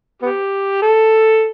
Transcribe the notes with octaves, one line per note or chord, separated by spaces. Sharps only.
B3 G4
A4